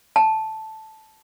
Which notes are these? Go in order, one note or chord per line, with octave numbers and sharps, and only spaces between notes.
A5